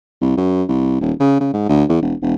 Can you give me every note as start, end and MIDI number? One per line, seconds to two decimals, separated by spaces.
0.21 0.34 36
0.37 0.63 42
0.68 0.96 36
1.01 1.13 27
1.20 1.36 49
1.40 1.52 49
1.53 1.67 44
1.69 1.84 38
1.89 2.01 40
2.02 2.14 28
2.22 2.35 28